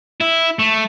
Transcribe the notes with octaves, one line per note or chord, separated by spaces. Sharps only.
E4
A3